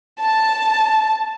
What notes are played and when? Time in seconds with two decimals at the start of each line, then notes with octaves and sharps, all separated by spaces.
0.20 A5